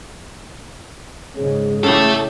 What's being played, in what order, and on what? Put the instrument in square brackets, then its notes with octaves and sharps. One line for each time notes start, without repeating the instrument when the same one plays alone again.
[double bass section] G#2 C#3 G#3 [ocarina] G#4
[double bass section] A1 [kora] C#3 E4 G4 [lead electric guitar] A4 E5